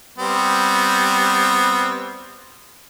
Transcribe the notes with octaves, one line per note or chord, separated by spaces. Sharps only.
G3 B3 C4